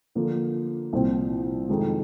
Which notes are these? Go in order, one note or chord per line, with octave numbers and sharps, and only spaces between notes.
D3 F3 A#3
C2 A#2 F3 C4
F2 C3 D#3 G#3